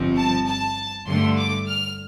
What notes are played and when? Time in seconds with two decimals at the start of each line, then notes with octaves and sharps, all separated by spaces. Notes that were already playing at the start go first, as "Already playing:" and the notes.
Already playing: G1 G2 F3 C4
0.17 A5
0.46 A5
1.06 G2 D3 A3 C6
1.37 D6
1.67 F6